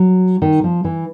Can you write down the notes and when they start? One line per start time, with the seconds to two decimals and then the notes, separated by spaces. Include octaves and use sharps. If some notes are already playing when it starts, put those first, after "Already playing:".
Already playing: F#3
0.42 D#3
0.64 F3
0.85 E3